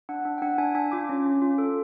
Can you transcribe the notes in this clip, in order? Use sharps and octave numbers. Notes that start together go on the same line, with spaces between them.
D4 F#5
D4
G5
D4 F#5
D4 G#5
D4 G#5
F4 D6
C#4
C#4
F4
A4